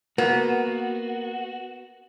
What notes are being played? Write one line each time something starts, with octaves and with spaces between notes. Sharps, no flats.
A#3 B3 F#4